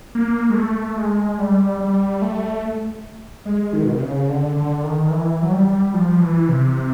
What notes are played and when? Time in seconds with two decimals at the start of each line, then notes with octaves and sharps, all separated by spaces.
0.15 A#3
0.50 G#3
0.55 A3
0.98 G#3
1.39 G3
1.80 G3
2.22 A3
3.46 G#3
3.73 D#3
3.84 B2
3.93 C3
4.01 C#3
4.29 D3
4.56 D3
4.84 D#3
5.10 E3
5.42 F#3
5.53 G3
5.94 F3
6.21 E3
6.49 C3